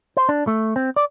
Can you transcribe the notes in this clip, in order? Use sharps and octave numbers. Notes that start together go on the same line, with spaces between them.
C5
D4
A3
C4
D5